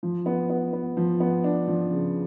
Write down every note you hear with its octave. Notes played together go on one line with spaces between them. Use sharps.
F3
B3
B3
B3
F3
B3
D4
F3
C#3